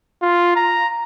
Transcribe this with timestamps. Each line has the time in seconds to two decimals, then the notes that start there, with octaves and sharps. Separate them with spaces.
0.22 F4
0.56 A#5